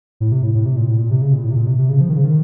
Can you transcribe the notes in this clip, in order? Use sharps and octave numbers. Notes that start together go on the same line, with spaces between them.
A2
C3
A2
A2
C3
A#2
A2
A#2
C3
C#3
A#2
A2
C3
A#2
C3
C3
C#3
F3
D#3
C#3
D#3